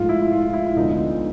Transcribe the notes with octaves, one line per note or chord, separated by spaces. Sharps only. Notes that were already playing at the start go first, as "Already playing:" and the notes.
Already playing: G#2 F3 A3 F4
E4
F4
E4
D2 D3 F3 G#3 B3 D#4